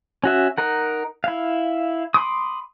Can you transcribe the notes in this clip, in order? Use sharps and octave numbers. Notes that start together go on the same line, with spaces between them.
C#4 F#4 E5
D#4 A#4 F#5
E4 F5
B5 C6 D6 D#6